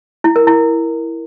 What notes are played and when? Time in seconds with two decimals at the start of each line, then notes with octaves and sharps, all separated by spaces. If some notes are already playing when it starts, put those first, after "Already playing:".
0.24 E4
0.36 A#4
0.47 E4